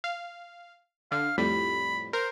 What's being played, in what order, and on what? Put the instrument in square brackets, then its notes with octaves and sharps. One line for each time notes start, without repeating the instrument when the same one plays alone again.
[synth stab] F5
[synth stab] D3 [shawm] F5
[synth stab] F2 A2 G3 [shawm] B5
[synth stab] A#4 [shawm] C5